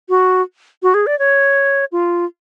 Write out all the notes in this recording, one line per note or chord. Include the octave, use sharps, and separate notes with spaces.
F#4
F#4
G#4
D5
C#5
F4